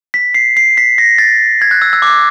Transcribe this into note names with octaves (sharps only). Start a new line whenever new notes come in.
B6
C7
C7
B6
A#6
A6
G#6
F#6
E6
E6
D6